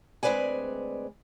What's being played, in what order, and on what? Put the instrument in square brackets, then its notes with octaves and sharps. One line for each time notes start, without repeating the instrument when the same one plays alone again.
[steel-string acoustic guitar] D2 G#3 C4 B4 D5 G#5